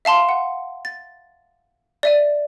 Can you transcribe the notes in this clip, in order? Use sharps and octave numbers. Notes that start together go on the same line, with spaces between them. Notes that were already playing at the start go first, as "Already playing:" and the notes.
E5 F5 A5 C6
F#5
A6
D5 E5 D#7